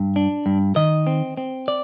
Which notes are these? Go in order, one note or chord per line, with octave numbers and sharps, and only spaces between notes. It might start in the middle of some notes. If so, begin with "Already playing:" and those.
Already playing: G2
D4
G2
D#3 D#5
C4
C4
D5